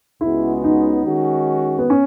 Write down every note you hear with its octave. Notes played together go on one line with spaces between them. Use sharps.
C#2 C#3 G#3 B3 E4 F#4
D#4
D#3 G#3 C#4 F#4
B3
C#4